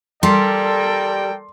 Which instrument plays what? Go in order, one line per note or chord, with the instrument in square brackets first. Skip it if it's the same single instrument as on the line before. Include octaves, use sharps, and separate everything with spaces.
[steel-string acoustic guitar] G3 [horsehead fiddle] A4 A#4 [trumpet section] D5 G5 [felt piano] C6